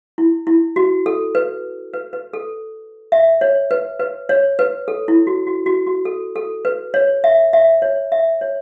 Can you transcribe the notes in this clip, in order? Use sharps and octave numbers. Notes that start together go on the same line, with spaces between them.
E4
E4
F#4
A4
B4
B4
B4
A4
E5
C#5
B4
B4
C#5
B4
A4
E4
F#4
F#4
F#4
F#4
A4
A4
B4
C#5
E5
E5
C#5
E5
C#5